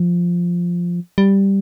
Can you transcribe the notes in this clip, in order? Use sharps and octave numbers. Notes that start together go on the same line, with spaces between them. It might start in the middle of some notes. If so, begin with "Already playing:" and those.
Already playing: F3
G3